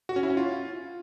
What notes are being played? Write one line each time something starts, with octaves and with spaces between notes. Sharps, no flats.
F#4
C#4
E4
C#4
F4